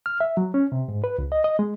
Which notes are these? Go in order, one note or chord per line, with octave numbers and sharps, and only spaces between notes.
F6
E5
F#3
C#4
C3
G#2
B4
C#2
D#5
D#5
G#3